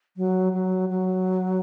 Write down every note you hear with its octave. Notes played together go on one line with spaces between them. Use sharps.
F#3
F#3
F#3